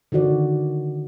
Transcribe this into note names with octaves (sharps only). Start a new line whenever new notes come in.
D3 D#3 F#4 D5